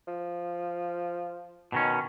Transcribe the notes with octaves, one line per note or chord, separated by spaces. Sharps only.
F3
B2 D#3 C#4